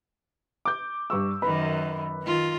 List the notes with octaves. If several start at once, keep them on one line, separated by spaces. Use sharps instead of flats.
D6 G6
G2 C#6 E6
F#2 D#3 B4 B5
D#3 F4